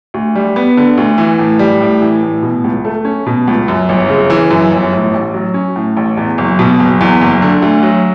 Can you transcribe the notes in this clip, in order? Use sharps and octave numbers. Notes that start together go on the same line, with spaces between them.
D2
G3
B3
D3
D2
E3
A2
G3
A2
E3
A2
B2
C#2
A3
C#4
B2
C#2
F#2
G1
C#3
E3
F#2
G1
A2
A1
F#3
C#4
A2
A1
E2
F#1
B2
F#1
E2
F#1
D3
D2
F#3